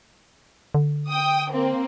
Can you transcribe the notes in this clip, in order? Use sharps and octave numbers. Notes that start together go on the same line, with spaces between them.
D3
G5 D#6
A#3 C4